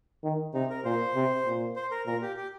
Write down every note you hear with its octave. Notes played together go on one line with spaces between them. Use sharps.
D#3
C3 D#4
A#4
A#2 C5
C3
A#2
C5
A#4
A#2 A#4
G4
G4